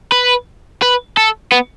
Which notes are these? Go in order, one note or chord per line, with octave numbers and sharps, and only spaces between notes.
B4
B4
A4
B3